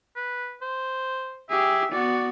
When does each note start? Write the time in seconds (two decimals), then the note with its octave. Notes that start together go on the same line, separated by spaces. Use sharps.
0.16 B4
0.62 C5
1.50 G4 G#4 E5
1.93 B3 F#4 D5